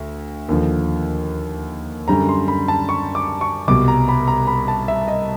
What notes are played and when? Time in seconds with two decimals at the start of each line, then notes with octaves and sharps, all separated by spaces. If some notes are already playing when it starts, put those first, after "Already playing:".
Already playing: D2
0.49 D#2 D3 F3
2.08 F#2 D3 G3 A#5
2.29 C6
2.48 B5
2.68 A5
2.89 C#6
3.15 D6
3.41 C#6
3.68 C2 B2 G3 D6
3.88 A#5
4.08 B5
4.28 A#5
4.47 B5
4.68 A5
4.88 E5
5.08 D#5